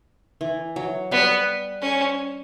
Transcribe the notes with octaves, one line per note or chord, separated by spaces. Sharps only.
E3
F#3
G3 B3
C#4